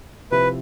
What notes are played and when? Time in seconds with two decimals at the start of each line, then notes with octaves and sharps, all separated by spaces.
0.31 C3 F3 C4 E4 B4